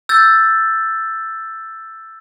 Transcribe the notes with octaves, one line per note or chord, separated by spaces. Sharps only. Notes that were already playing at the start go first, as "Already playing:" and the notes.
E6 G6 A6